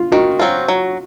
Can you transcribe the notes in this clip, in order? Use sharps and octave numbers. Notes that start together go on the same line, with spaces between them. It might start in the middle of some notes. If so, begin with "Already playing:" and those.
Already playing: F4
D#3 F#4
F#3 C4 F4
F#3